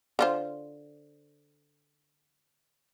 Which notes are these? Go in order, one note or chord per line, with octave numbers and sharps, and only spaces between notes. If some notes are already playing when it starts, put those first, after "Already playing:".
D3 F4 C5